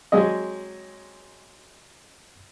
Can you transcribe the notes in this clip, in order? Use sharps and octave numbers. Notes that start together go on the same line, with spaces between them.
F#3 G#3 C4 D#5